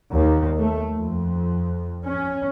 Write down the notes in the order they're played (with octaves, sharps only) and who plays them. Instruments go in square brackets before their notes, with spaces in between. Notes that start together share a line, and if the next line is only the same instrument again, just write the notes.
[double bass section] D#2
A3
F2
C#4